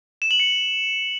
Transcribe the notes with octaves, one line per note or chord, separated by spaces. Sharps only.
E7
F#7
C#7